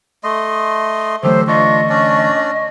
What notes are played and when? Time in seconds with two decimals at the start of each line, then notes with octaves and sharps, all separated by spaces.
0.24 A3 D#5 C6
1.23 D3 E3 F#3 A3 G4 A4 C5
1.47 D4 F4 D#5 C#6
1.90 C#4 D4 D5